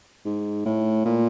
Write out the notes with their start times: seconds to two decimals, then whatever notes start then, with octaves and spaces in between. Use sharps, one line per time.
0.25 G#2
0.65 A2
1.05 A#2